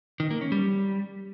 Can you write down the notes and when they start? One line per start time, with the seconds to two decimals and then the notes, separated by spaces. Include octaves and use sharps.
0.20 D#3
0.30 A#3
0.41 C#4
0.52 G3